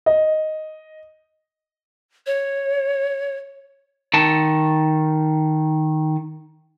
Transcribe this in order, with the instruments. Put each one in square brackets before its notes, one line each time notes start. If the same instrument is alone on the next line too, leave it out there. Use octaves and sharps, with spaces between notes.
[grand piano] D#5
[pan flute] C#5
[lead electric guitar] D#3 A5